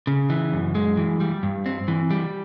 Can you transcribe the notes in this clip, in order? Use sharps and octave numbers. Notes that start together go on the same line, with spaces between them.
C#3
E3
F#2
G#3
E3
G3
G2
C4
E3
G3